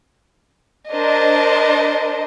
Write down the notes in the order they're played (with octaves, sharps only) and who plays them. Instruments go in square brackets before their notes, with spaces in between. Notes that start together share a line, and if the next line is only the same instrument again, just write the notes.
[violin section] D4 A#4 C5 D#5